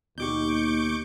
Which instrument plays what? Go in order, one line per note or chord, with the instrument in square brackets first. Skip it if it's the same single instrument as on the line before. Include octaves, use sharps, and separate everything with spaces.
[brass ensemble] D#2 [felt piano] B2 G4 [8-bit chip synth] C#6 D6 G6